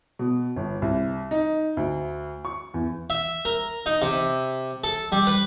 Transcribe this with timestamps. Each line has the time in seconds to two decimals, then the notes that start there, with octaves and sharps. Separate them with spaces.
0.19 B2
0.56 G1
0.82 C2
1.31 D#4
1.77 D2
2.45 C#6
2.74 E2
3.10 E5
3.45 A#4
3.86 D#4
4.02 C3
4.84 A4
5.12 G3
5.27 B4